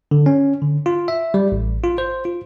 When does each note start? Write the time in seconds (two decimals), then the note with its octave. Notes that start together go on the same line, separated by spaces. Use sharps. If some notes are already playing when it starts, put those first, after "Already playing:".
0.11 D3
0.26 C#4
0.62 D3
0.86 F4
1.08 E5
1.34 G3
1.52 A1
1.84 F4
1.98 C5
2.25 F4